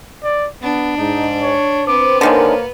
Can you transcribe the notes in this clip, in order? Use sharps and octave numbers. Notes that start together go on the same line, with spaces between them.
D5
B3 D4
G#2 D#4
C#5
B3 C4 C5 D6
D3 D#3 G#3 A#3 A#4 C5 C#5